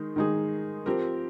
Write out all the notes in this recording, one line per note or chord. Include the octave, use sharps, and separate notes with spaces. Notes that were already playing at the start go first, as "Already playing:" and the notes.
Already playing: D#3 G#3 D#4
D#3 G#3 D#4 G#4
F3 C4 G4 A#4